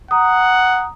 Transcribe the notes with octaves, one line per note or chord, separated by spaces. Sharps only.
F#5 A#5 D#6